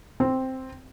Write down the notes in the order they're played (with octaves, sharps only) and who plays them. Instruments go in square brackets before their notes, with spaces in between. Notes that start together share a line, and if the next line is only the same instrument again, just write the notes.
[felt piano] C4